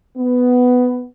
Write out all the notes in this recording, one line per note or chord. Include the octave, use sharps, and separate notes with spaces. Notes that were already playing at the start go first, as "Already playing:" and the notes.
B3